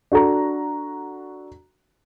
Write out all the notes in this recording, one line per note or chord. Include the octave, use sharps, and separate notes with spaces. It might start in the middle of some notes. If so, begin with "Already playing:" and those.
D4 F#4 A4 A#5